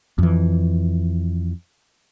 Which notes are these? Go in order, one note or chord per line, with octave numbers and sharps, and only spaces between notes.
F2 E3